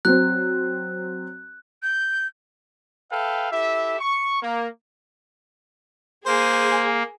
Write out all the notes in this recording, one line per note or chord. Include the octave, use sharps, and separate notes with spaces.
F#3 C4 F#6
G6
A4 B4 E5 F5 G5
E4 G4 A4 E5
C#6
A#3
A#3 G#4 C5